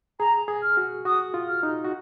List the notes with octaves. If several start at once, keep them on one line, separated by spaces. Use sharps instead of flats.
G#4 A#5
G#4
F6
F#4
F#4 D#6
F4
F6
D#4
F#4